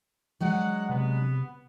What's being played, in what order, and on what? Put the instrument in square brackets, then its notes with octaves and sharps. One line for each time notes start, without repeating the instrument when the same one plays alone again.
[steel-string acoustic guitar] F#3 G#3 D4 [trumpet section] F#5
[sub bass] C3 [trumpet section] B3